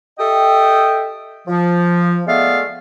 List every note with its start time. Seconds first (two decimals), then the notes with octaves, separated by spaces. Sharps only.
0.19 G4 A4 D#5 E5 G5
1.47 F3
2.27 G#3 A3 B3 D5 E5 F5